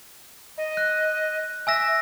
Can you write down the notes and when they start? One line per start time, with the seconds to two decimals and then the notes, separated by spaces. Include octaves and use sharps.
0.58 D#5
0.77 F#6
1.67 E5 G#5 E6 A#6